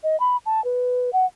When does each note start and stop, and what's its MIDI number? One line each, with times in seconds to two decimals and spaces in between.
0.03 0.19 75
0.20 0.37 83
0.46 0.63 81
0.64 1.10 71
1.13 1.25 78